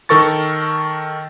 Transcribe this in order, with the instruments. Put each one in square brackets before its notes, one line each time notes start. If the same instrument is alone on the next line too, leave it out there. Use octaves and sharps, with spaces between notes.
[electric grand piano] D#3 A4 A#4 C#6 A6